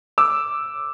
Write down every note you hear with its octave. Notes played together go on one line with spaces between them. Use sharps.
D6 E6